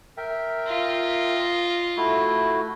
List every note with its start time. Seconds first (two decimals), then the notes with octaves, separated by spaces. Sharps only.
0.17 A#4 E5 G5
0.66 F4 D#5
1.97 A3 E4 F#4